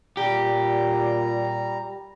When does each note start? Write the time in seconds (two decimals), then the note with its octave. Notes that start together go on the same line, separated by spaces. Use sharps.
0.17 A#2 G3 G4 A#5